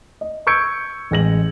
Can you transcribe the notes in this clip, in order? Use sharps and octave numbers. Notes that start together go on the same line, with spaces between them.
D#5
C#6 E6 G6 G#6 C#7 D7
A1 G#3 A#6 F#7